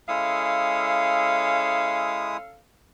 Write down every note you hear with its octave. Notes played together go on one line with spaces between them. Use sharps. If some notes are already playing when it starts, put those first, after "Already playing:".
G#3 C#4 E4 A4 F5 D#6